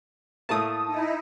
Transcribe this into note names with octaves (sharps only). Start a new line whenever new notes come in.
A2 A3 A#3 A5 D#6
D#4 E4